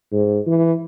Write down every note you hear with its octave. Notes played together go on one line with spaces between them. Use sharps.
G#2
E3